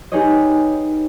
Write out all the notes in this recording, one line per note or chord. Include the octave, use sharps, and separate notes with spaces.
D#4 G4 G#4 B4 C#5 D#5